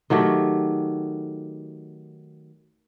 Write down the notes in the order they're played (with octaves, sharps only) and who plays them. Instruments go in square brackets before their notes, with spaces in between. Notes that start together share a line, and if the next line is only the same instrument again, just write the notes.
[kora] D#3 F#3 A3 G4